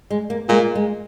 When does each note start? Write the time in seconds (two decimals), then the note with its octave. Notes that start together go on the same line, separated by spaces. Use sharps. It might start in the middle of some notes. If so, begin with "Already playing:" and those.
0.10 G#3
0.30 A#3
0.49 A#2 G#3
0.75 G#3